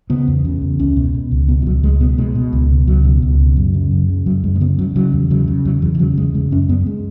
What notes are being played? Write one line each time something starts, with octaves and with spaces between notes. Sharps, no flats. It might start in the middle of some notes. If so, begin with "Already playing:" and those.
C#3 B3
E2
C#3
E2
C#2 C#4
B2
B2
C#2
B2 B3
E3
C#2 F#3
C#2 G#3
B2 B3
B2 G#3
B2
C#2
B2
C#2 F#3
B2
C#2
B2
F#2
C#3
F#2
C#3
F#2 F#3
F#2 G#3
G#3
C#3 B3
C#3 F#3
C#3 F#3
E2
C#3 F#3
C#3
E2 F#3
E2 E3
E3
C#3 F#3
E2 G#3
C#3 G#3
F#2 C#4
F#2 B3
G#3